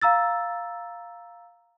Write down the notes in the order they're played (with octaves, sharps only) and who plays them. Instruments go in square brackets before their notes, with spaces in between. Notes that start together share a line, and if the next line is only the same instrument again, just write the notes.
[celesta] F5 A#5 E6 A6